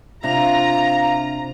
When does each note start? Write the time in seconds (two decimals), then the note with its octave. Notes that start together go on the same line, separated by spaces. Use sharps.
0.23 C3 D4 F4 A#5